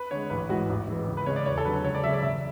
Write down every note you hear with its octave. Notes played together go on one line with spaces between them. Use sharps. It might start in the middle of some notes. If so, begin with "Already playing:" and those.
Already playing: B4
D3 G#3 C#5
A1 B4
G#2 E3 G#3 F#4
A1
G#2 E3 G#3
C#2
B4
C#3 G#3 C#5
D5
E2 C#5
A4
D3 F#3 B4
C#2 C#5
D5
C#3 F#3 E5
D5
E1 E5